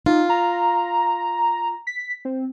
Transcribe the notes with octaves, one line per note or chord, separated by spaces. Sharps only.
D#4 F4
A#5
B6
C4